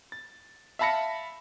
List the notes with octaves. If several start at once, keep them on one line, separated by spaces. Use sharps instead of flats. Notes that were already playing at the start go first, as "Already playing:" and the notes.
A6
E5 F5 A5 B5 A#6 C#7